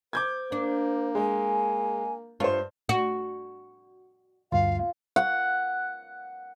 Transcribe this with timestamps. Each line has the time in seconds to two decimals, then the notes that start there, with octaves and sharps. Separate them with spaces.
0.13 C5 D6 G6 G#6
0.52 A#3 D4
1.15 G#3 G#5
2.40 G2 F4 C5 C#5
2.89 F#4
4.52 D2 G2 F4 F5
5.16 F#5